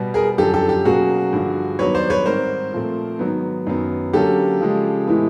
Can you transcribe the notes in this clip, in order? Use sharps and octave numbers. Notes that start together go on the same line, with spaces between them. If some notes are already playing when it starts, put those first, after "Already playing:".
Already playing: B2 G3 B3
G#4 A#4
F#2 D3 F3 G4 A4
G4 A4
G4
B2 F#3 A#3 C#4 F#4 G#4
G2 D3 F3
G2 D#3 F#3 B3 B4 C#5
C5 D5
B4 C#5
G#2 D#3 G3 C4 A#4 C5
A#2 F3 A3 C4
G#2 D#3 F#3 B3
F#2 D#3 F#3 B3
D3 F#3 A#3 C#4 G4 A4
C#3 F3 G#3
A2 E3 G#3 B3